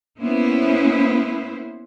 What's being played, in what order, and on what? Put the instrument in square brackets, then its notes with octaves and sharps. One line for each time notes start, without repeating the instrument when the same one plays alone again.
[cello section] A#3 B3 C#4 E4 C5